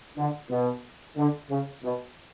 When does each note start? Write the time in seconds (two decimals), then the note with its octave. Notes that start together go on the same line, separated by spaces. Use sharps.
0.18 D3
0.50 B2
1.17 D3
1.50 C#3
1.83 B2